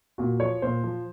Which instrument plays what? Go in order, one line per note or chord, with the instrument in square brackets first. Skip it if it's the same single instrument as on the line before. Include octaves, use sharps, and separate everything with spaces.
[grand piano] A#2 F#4
F3 C#5
A#2 C5
F3